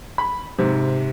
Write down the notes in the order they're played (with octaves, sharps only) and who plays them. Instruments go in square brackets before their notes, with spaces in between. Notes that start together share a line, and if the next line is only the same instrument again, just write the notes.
[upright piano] B5
G#2 C3